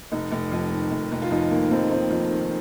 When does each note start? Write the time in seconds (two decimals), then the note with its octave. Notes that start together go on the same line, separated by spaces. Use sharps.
0.12 F1 D#4
0.32 F1
0.52 F2
0.71 D#3
0.91 F1
1.12 F1
1.22 F4
1.31 F2 D#4
1.51 D#3 A#3
1.71 F1 C4
1.91 F1 C4
2.11 F2
2.31 D#3